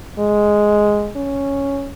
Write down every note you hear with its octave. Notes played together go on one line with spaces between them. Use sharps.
G#3
C#4